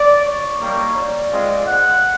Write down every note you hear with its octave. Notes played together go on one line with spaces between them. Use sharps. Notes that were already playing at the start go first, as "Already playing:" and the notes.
Already playing: D5
C#5
G3 A#3 D#4
D5
G#3 C4 F4
F#5